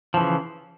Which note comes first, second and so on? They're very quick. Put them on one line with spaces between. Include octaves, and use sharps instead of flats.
F3 E3 C#3